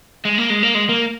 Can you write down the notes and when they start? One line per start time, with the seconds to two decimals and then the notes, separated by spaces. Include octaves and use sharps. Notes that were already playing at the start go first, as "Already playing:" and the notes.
0.25 G#3
0.38 A#3
0.50 G#3
0.63 A#3
0.75 G#3
0.89 A#3